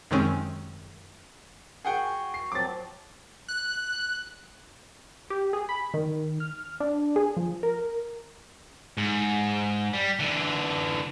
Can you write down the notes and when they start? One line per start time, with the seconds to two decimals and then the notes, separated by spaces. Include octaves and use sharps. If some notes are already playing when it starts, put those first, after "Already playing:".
0.11 F#2 C3 D#3 G#3 C4 C#4
1.84 F#4 G#4 F#5 G5
2.34 C7
2.52 F3 F#3 C4 D6 A6
3.48 F#6
5.30 G4
5.53 G#4
5.69 B5
5.94 D#3
6.40 F6
6.80 D4
7.16 G#4
7.37 F3
7.63 A#4
8.98 G#2
9.93 G3
10.20 D3 E3